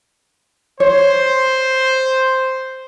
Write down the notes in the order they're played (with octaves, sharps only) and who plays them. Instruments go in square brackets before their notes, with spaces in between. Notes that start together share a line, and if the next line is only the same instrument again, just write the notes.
[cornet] C5 [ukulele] C#5